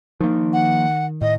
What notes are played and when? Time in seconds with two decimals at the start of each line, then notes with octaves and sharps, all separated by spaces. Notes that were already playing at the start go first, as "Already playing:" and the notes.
0.21 D#3 F3 A#3
0.53 F#5
1.22 A2 D#5